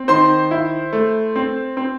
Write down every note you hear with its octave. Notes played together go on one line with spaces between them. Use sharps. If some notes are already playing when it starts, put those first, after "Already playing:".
Already playing: C4
D#3 C5 C6
E4
A3
C4
C4